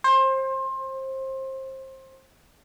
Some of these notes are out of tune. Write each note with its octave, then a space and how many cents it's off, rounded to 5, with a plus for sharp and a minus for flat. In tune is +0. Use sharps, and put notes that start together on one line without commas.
C5 +25